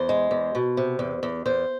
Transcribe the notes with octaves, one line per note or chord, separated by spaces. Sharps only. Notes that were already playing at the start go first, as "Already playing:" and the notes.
Already playing: E2 C5
G#3
E2
B2
C3
E2
E2
E2 C5